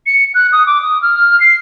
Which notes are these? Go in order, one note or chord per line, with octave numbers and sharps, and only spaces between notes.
C#7
F#6
D#6
D6
D#6
F6
C7